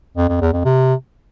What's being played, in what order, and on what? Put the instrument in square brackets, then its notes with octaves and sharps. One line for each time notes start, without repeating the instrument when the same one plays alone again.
[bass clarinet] F2
F2
E2
F2
C3